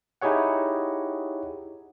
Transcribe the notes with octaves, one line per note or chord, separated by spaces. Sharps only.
D#4 E4 G4 G#4 C#5 F#5